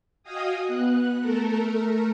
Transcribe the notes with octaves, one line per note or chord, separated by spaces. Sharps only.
F#4 D#5 F5 G5 G#5 D#6
B3 F#6
A3 A4 A#4